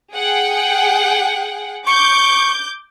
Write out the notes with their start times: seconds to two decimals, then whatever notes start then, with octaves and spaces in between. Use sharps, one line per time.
0.15 G#4 F#5 G5
1.87 C#6 D6 G6